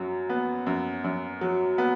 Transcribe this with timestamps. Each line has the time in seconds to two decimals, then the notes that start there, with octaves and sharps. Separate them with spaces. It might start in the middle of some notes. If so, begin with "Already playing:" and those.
Already playing: F#2 F#3
0.30 B3
0.67 F#2
1.04 F#2
1.41 F#3
1.78 B3